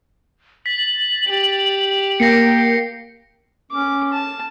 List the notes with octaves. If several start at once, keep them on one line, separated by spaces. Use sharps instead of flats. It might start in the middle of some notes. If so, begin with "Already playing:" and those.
A6 B6 F#7
G4
A#3 G5 A#6 C7 C#7
C#4 D6
A5